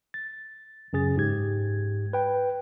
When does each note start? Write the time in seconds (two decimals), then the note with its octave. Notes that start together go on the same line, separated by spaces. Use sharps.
0.14 A6
0.93 F#2 C#3 G#4 A6
1.17 G#2 G4 G#6
2.13 B4 G5